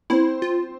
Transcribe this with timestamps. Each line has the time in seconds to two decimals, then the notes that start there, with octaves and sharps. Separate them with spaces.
0.10 C4 E4 C5
0.42 F4